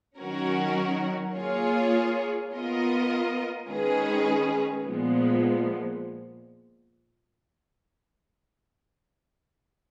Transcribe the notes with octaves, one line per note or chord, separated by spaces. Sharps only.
D#3 F#3 C#4 F#4 A#4
A#3 F4 G#4 C#5
B3 F4 A#4 D#5
D#3 G#3 C#4 G#4 B4
A#2 F3 G#3 B3